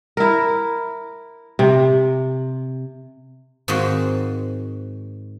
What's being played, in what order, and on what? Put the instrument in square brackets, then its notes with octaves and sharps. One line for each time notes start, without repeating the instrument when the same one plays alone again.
[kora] E4 A#4
C3
[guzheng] G#2 D#3 G#3 C4 F#4